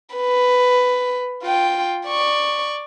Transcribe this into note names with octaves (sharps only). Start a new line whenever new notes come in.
B4
F4 G5
D5 C#6